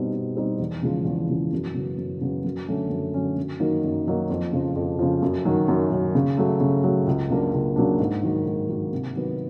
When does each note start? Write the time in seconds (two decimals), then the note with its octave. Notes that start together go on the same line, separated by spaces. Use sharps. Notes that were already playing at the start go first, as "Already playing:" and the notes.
Already playing: B2 G3 C4 D#4
0.13 B2
0.36 G3 C4 D#4
0.60 E2
0.83 C#3 F3 G#3
1.05 E2
1.29 C#3 F3 G#3
1.53 F#2
1.75 C#3 F#3 B3
1.98 F#2
2.21 C#3 F#3 B3
2.44 F#2
2.68 D3 F#3 A3 C#4
2.90 F#2
3.14 D3 F#3 A3 C#4
3.37 F#2
3.60 D#3 F#3 A#3 D#4
3.84 F#2
4.07 D#3 F#3 A#3 D#4
4.30 F2
4.53 C#3 F3
4.76 F2
4.99 C#3 F3
5.22 F#2
5.45 D#3 F#3
5.68 F#2
5.92 D#3 F#3
6.15 C#3
6.38 F#3 A3
6.60 C#3
6.84 F#3 A3
7.07 C#2
7.30 C#3 F#3 A#3 D4
7.54 C#2
7.76 C#3 F#3 A#3 D4
8.00 G#2
8.23 D#3 F#3 A#3
8.45 G#2
8.69 D#3 F#3 A#3
8.92 C3
9.15 D#3 F#3 B3